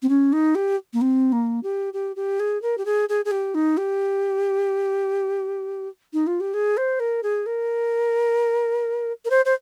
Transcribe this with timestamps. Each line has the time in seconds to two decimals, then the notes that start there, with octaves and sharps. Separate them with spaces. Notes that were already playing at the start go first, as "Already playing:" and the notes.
0.02 C4
0.09 C#4
0.32 D#4
0.55 G4
0.93 A#3
1.01 C4
1.32 A#3
1.63 G4
1.93 G4
2.16 G4
2.39 G#4
2.62 A#4
2.77 G4
2.85 G#4
3.09 G#4
3.25 G#4
3.31 G4
3.54 D#4
3.77 G4
6.13 D#4
6.27 F4
6.40 G4
6.54 G#4
6.77 C5
7.00 A#4
7.23 G#4
7.46 A#4
9.25 A#4
9.30 C5
9.45 C5